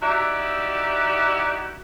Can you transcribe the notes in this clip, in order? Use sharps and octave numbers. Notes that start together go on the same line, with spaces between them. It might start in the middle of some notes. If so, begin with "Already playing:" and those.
D#4 E4 F#4 G4 D5 E5